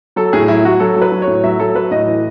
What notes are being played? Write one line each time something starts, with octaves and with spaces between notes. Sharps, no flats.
F#3 A4
A2 G#4
F#3 E4
F#3 F#4
F#3 A4
F#3 B4
F#3
C#5
A2
F#3 E5
F#3 A4
F#3 B4
A2 D#5
E3